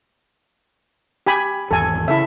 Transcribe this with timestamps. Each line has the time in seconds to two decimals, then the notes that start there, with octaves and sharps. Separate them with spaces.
1.27 G4 G#5 B5
1.71 G#1 E2 A4 G#5
2.08 C#3 E4 A4 E5